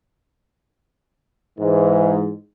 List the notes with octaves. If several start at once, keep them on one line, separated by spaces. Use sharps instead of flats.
G#2 E3